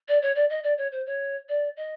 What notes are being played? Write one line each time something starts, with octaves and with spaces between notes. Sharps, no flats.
D5
C#5
D5
D#5
D5
C#5
C5
C#5
D5
D#5